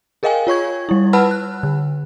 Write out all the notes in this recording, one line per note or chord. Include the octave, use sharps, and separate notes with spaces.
G#4 A#4 D#5 F5 G5 G#5
F4 C#5 C#6 G#6
G3 E4
B4 F#5 A5 B5 E6 F6
F#6
D3